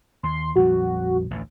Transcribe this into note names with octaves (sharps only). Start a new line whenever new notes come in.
D#2 C6
A#1 F2 G3 F#4
A1 D2